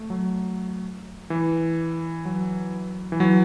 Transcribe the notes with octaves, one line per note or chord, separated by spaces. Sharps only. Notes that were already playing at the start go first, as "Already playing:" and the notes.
Already playing: A3
F#3
E3
F#3
E3
F#3